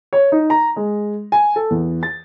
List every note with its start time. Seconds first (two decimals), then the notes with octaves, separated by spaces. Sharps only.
0.13 C#5
0.32 D#4
0.50 A#5
0.76 G#3
1.32 G#5
1.56 A4
1.70 E2
2.03 A6